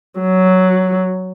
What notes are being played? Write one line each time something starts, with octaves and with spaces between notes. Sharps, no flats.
F#3